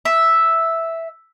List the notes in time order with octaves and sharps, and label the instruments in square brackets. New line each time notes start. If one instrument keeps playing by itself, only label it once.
[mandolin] E5